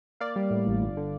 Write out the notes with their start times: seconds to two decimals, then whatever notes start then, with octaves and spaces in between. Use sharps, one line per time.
0.20 A#3 D5 F5
0.36 G3
0.51 A2
0.67 A1
0.82 G1
0.97 D3